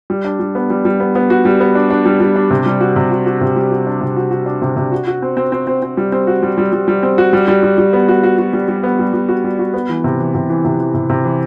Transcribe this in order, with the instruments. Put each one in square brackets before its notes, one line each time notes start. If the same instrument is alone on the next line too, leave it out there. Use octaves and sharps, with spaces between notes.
[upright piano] G3
D4
G3
B3
G3
G3
B3
B3
F#4
G3
B3
D4
D4
G3
G3
D4
C3
G3
F#4
C3
F#4
F#4
C3
G3
F#4
D4
C3
F#4
F#4
D4
C3
C3
F#4
F#4
C4
C4
C4
C4
C4
G3
C4
F#4
G3
G3
G3
G3
C4
F#4
G3
G3
G3
G3
B3
F#4
F#4
F#4
G3
G3
B3
G3
G3
F#4
G3
F#4
B3
E3
C3
E3
C3
E3
C3
E3
C3
C3
E3